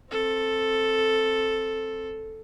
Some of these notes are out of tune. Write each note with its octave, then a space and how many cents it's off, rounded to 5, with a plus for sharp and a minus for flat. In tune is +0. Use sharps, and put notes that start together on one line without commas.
C4 +15 A4 +0